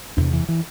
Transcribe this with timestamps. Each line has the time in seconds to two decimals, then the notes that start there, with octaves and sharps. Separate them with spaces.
0.17 E2 C3 D4
0.33 E3
0.49 E3